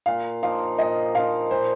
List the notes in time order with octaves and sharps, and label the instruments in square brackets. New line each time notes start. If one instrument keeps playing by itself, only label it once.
[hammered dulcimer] A#2 [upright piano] F5
[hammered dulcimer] F3 A#3 D#4 [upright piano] F5
[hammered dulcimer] A#2 [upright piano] D#5
[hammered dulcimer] F3 A#3 D#4 [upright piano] F5
[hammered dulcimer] A#2 [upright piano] C5